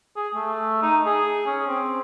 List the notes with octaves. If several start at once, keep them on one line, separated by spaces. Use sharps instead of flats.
G#4
A3
D#4
G#4
C#4
C4